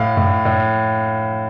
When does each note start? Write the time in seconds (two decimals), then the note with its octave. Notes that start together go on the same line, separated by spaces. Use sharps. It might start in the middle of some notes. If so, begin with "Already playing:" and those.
Already playing: A2 F5
0.17 A2
0.45 A2